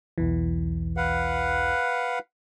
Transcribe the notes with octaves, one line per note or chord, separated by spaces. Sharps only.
B1 E2 E3
B4 F5 F#5